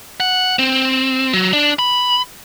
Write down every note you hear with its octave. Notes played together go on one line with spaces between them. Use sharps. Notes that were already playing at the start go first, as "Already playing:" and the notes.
F#5
C4
F#3
D4
B5